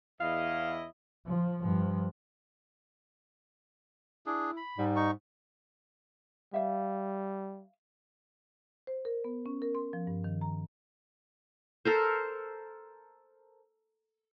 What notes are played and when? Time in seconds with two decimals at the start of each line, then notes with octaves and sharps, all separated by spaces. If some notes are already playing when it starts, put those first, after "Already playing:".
0.20 E2 E4 D#5 F5
1.27 F3
1.61 G2 F3
4.26 D4 E4 G#4
4.57 B5
4.78 G#2 G3
4.96 D#4 C#6
6.54 G3 E5 F5
8.87 C5
9.05 A#4
9.24 B3
9.46 C#4
9.62 A#4
9.75 C6
9.93 F3
10.07 G2
10.24 D#3
10.41 A#5
11.85 A4 A#4 C5